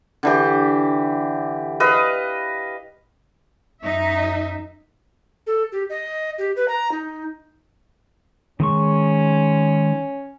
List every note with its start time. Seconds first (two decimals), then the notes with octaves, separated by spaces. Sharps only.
0.23 D3 E3 G4
1.80 B4 D#5 F5
3.81 F#2 D#4 E5
5.47 A4
5.72 G4
5.90 D#5
6.38 G4
6.56 B4
6.68 A#5
6.92 D#4
8.60 D#3 G#3 C#4 C#6